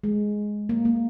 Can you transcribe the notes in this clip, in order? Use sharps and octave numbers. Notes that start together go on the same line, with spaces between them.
G#3
A#3
A#3